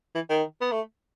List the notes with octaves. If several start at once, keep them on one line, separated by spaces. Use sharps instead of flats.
E3
D#3
B3
A3